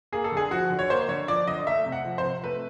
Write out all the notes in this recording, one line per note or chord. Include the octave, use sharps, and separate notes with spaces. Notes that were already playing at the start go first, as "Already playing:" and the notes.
A#3 G#4
A4
D3 G#4
F3 F#4
D3
C#5
A#3 C5
D3 C#5
F3 D5
D3 D#5
A3 E5
C3
F#5
F3
C5
C3
A3 B4